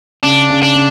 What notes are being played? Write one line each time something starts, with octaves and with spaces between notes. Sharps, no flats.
C#3 D4
C#3
D4
C#3